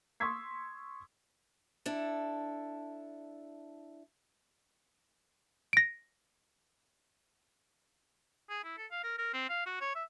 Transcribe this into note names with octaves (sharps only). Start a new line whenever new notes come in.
C6 C#6 D#6 E6 G#6 B6
D4 E4 A4
A#6 D7
G#4
E4
A4
F5
A#4
A#4
C4
F5
F#4
C#5
E5